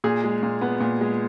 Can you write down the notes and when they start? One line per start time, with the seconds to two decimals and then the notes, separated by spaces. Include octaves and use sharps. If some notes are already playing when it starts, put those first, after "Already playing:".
0.04 A#2 G#4
0.24 G#3
0.43 A#2
0.61 B3
0.80 A#2
1.01 G#3